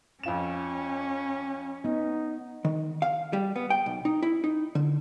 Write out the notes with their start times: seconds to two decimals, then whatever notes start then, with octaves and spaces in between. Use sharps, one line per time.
0.23 F2 C#4 F4 E7
1.85 B3 D#4
2.65 D#3
3.02 F5
3.33 G3
3.56 B3
3.70 G5
3.86 B1
4.05 D#4
4.23 E4
4.44 D#4
4.75 D3